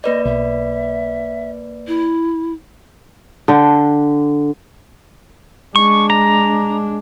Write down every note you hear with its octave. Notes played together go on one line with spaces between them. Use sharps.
A#3 B4 D5 D#5
B1 E5
E4
D3 G5
G#3 D4 C#6
A#5